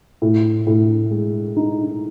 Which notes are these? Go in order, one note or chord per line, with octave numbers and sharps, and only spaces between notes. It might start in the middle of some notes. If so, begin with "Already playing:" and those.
A2
A2
G#3
D#4